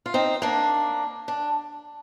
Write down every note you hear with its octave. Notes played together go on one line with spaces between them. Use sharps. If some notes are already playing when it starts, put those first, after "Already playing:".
F4
C4 D#4
A#3 D4
D4